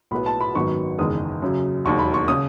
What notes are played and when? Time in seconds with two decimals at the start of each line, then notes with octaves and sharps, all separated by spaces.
0.11 B1 A2 F#3 B3 B5
0.26 A5
0.41 B5
0.55 G#1 F#2 D#3 F#3 B3 C#6
0.98 F#1 E2 D#3 G#3 D#6
1.42 F#2 C#3 F#3
1.85 E1 D#2 D#3 F#3 C#6
1.99 B5
2.14 C#6
2.28 C#3 D#6